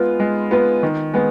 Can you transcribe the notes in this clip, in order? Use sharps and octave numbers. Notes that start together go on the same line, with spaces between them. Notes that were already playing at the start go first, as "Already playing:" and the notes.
Already playing: G#3 B3 F4 B4
G#3
B3 F4 B4
D#3
G#3 B3